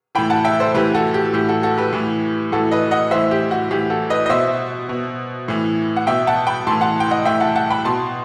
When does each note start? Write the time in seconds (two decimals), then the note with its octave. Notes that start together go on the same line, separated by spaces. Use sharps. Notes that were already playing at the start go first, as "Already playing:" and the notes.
0.15 A2 E3 G5 B5
0.30 F#5 A5
0.45 E5 G5
0.59 A4 C5
0.74 A2 E3 G4 B4
0.95 F#4 A4
1.14 G4
1.34 A2 E3 G4
1.49 F#4 A4
1.63 F#4 A4
1.78 G4 B4
1.93 A2 E3
2.52 A2 E3 F#4 A4
2.71 B4 D#5
2.91 D#5 F#5
3.11 A2 E3 C5 E5
3.31 G4
3.51 F#4
3.71 A2 E3 G4
3.90 F#4 A4
4.10 B4 D#5
4.26 D#5
4.29 B2 C5 E5
4.89 B2
5.48 A2 E3
5.97 F#5
6.07 B2 E5 G5
6.27 F#5 A5
6.47 G5 B5
6.67 A2 E3 A5 C6
6.81 F#5 A5
7.00 G5
7.11 D#5 F#5
7.25 A2 E3 E5 G5
7.40 F#5 A5
7.56 F#5 A5
7.70 G5 B5
7.85 B2 A5 C6